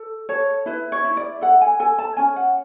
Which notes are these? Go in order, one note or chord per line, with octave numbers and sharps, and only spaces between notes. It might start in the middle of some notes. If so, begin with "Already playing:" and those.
Already playing: A4
A4 C#5
E4 B4
C#5
E4
D5
A4 F#5
G#5
A4 G#5
A5
C#4 G#5
F#5